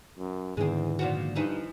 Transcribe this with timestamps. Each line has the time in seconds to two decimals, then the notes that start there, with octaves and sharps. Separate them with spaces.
0.18 F#2
0.57 E2 G#2 D3 D#3 G#3 C4
0.99 A#2 F3 F#4
1.36 G2 E3 F3 D#4